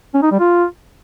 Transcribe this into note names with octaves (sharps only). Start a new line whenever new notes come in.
C#4
D#4
G3
F4